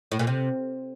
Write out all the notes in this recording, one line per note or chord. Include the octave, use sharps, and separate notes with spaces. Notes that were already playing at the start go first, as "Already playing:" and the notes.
A2
A#2
C3